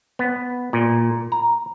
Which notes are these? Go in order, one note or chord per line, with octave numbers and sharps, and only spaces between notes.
B3
A#2
A#5